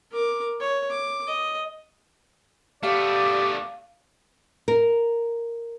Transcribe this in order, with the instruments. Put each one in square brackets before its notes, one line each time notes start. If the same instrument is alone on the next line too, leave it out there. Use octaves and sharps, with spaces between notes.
[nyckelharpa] A#4 D6
C#5
D6
D#5
[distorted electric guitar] A3 B3 [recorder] G4 [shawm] D5 [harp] F5
[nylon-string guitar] A#4